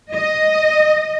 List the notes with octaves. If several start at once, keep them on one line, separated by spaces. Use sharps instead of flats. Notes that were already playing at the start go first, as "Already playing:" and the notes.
D#5